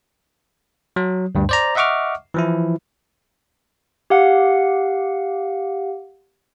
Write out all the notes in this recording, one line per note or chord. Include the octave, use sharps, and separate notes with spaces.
F#3
D2 G2
C5 D5 A#5
D#5 E5 F#5 C#6 D6 F6
E3 F3 E4
G4 F5 F#5